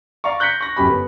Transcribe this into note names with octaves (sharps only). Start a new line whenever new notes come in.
D5 F5 A#5 C#6
F#6 G6 A#6 B6 C#7
C#6 A#6
G1 F#2 C#4 G4 B5
B3